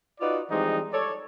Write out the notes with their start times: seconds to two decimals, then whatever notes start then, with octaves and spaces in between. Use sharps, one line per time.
0.21 D#4 F4 F#4 B4 D5
0.51 E3 F3 G3 G#3 C4 D#4
0.93 A4 C#5 D5